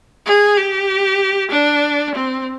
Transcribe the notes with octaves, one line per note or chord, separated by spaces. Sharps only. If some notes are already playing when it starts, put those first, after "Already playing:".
G#4
G4
D4
C4